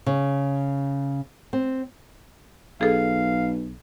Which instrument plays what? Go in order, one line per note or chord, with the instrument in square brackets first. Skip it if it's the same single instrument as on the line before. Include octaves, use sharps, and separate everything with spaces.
[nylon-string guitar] C#3
C4
[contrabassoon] B1 [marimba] G#4 A4 [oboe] F5